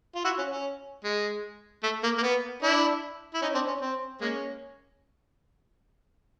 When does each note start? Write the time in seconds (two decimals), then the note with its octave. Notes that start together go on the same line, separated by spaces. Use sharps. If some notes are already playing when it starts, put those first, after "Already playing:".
0.15 F4
0.24 E4 F#4
0.38 C#4
0.51 C#4
1.04 G#3
1.83 A3
2.03 A#3
2.18 A#3
2.22 B3
2.63 D4 E4
3.34 E4
3.42 C#4 D#4
3.55 C4 D4
3.68 C#4
3.81 C4
4.21 G#3 A#3 C#4